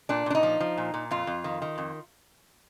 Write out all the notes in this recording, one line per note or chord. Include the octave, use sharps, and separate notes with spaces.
A#2 D4
A#2 D4
D#4
F3
F3
A#2
A#2
F2 F4
F2
D#3
D#3
F2